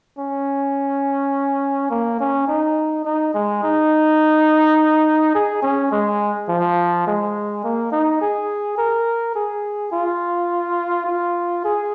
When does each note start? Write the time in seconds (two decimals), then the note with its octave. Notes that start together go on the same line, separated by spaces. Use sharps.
0.19 C#4
1.90 A#3
2.20 C#4
2.48 D#4
3.05 D#4
3.34 G#3
3.63 D#4
5.35 G#4
5.63 C#4
5.92 G#3
6.49 F3
7.07 G#3
7.64 A#3
7.92 D#4
8.21 G#4
8.78 A#4
9.36 G#4
9.92 F4
11.06 F4
11.64 G#4